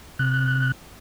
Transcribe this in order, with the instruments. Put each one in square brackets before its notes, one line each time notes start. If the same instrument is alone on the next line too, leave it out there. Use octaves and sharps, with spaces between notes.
[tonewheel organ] C3 F#6